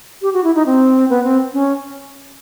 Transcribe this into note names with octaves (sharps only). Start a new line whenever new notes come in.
G4
F#4
E4
D#4
C4
B3
C4
C#4